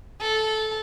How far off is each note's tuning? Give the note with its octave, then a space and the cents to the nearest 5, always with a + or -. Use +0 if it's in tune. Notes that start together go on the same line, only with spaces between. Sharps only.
A4 -15